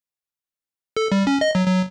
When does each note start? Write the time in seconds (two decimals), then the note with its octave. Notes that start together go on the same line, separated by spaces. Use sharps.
0.97 A4
1.12 G3
1.27 C#4
1.41 D#5
1.55 F#3
1.66 F#3